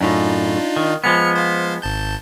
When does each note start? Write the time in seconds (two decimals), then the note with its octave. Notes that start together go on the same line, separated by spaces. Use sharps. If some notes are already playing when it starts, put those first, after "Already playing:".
0.01 F#2 A2 D4 D#4 F4
0.76 D#3
1.04 F3 G#3 B3 F6 C#7
1.35 C5 F5
1.82 G#1 A5 G6